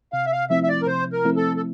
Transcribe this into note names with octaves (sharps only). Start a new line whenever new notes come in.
C3 F5
E5
F5
F3 A3 C4 E4 E5
E5
D5
A#4
C3 C5
A#4
F3 A3 C4 E4
A4
A4